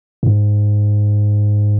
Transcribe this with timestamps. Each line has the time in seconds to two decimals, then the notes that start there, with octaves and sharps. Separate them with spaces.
0.23 G#2